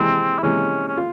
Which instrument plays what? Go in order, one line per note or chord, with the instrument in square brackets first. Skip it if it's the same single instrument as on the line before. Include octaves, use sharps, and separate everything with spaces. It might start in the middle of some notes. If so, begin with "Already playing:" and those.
Already playing: [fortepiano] C3 E3 G#3 [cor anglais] C4
[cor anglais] E4
[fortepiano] C3 E3 G#3 [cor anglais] C#4
[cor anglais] C#4
[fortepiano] F4